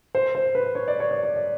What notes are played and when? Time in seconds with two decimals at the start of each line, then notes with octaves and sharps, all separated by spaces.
0.15 C5
0.35 C5
0.55 B4
0.75 C#5
0.88 D5
1.00 C#5
1.11 D5
1.23 C#5
1.36 D5